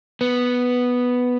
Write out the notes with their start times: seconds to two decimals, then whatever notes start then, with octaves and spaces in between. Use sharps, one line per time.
0.21 B3